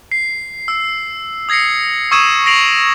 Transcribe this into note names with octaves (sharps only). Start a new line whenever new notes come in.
C7
E6
D#6 G#6 A#6 C7 C#7
C#6 D#6 E6 G#6 D#7 E7
A#6 C7 D7 F7 F#7